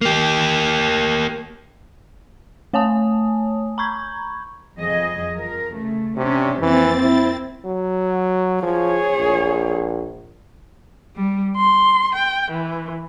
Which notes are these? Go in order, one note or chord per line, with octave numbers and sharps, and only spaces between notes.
A#3 G4
A3 C#5 G#5 A5 D#6
A#5 B5 C#6 G6 G#6
F2 G#4 D#5
F3 A#4
C#3 A3
C3 C#4 D4 G4
F2 E3 A#3 C4 A6
E4
F#3
F3 G#4 C#5
A#1
G3
C6
G5
E3